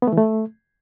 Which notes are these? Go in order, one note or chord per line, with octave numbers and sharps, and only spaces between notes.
B3
A3
E3
A3